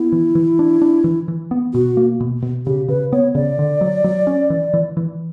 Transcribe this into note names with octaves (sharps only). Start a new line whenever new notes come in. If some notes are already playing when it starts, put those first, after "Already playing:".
Already playing: B3 E4
E3
E3
D4
D4
E3
E3
B3
B2 F#4
A#3
B2
B2
C#3 G4
C#3 B4
B3 C#5
C#3 D5
D3
F#3
F#3
C#4
E3
E3
E3